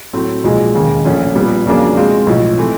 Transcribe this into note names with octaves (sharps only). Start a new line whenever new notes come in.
A2 F#3 A3 C4
B1 A#2 F3 G#3
E1 D#2 C#3
A#1 A#2 F3 A3 C#4
A#2 G3 B3
F2 C#3 F#3 A#3 D4
B2 G#3 C4 F4
B1 A2 F3
E3 A3 C4